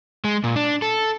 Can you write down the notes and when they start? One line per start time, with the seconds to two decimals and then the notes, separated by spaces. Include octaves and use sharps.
0.24 G#3
0.44 A#2
0.56 D4
0.82 A4